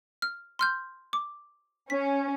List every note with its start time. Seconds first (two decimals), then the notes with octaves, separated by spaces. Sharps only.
0.22 F6
0.59 C6 F6 G6
1.13 D6
1.90 C#4 B6